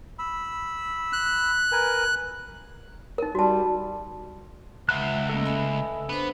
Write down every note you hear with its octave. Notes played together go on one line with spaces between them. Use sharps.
B5 E6
F#6
A#4 B4 G#5
D#4 A#4
G3 F#4 A5
C#2 G#3 E5 F#5 F#6
A3 A#3 C#4 A4 D#5
E5 G#5 B5
B3 D4 C5